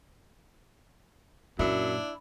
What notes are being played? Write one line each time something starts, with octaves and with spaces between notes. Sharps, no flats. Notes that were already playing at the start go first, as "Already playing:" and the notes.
F#2 A#2 D4 E4